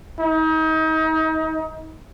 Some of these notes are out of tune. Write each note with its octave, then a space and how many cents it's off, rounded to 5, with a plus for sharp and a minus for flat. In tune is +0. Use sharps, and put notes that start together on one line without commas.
D#4 +35